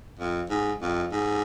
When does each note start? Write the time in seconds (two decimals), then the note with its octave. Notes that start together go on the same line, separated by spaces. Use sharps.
0.20 F2
0.50 G#2
0.82 F2
1.12 G#2